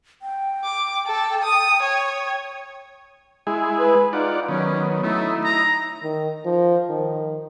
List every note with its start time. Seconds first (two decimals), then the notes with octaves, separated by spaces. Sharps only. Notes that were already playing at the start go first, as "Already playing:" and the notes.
0.22 G5
0.64 D6
1.07 A4
1.43 D#6
1.82 C#5
3.47 G#3 E4 G#4
3.79 B4
4.13 D#4 F4 D5 F#5
4.48 D#3 F#3 B3 C#4
5.03 A3 D#4 E4
5.45 A#5
6.03 D#3
6.45 F3
6.89 D#3